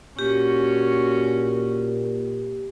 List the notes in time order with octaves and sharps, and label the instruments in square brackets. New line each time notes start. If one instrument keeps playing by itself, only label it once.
[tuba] A#2 [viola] C#4 F#4 [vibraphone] G4